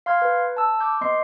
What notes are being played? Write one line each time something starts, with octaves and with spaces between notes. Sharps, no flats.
F5 C6 F6 G#6
B4
A5 E6
D6 G6
B3 D#5 C6 C7